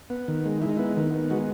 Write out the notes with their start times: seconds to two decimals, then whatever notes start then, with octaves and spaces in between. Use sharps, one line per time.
0.10 B3
0.28 D#3
0.46 G#3
0.62 G#3 E4
0.69 D#4
0.77 B3 E4
0.97 D#3
1.14 B3
1.30 G#3 F#4